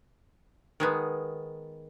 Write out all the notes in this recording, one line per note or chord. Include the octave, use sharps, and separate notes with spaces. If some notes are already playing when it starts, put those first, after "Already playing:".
D#3 G#3 B3